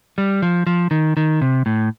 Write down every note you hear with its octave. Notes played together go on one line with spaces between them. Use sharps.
G3
F3
F3
D#3
D#3
C3
A2